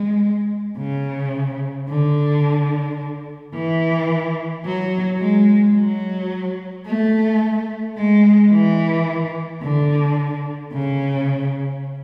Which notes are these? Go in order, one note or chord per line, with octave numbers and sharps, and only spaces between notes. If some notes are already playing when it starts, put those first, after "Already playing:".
Already playing: G#3
C#3
D3
E3
F#3
G#3
F#3
A3
G#3
E3
D3
C#3